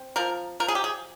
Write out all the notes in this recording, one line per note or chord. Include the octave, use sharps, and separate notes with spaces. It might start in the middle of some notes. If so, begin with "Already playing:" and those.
Already playing: C4
F3 A#4
F3 A#4
G#4
G4
G#4